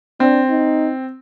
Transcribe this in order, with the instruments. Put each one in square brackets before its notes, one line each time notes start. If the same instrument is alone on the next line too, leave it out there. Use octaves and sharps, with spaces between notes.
[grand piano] C4 [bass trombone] D4
[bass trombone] D#4